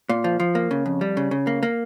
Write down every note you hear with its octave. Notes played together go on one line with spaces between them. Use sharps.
A#2
F3
F3
A#3
C#3
F2
G3
C#3
C#3
A#3
A#3